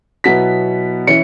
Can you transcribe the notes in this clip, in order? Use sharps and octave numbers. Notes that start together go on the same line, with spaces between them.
B2 F#3 B3 E4 B6
E3 C#4 E4 C#7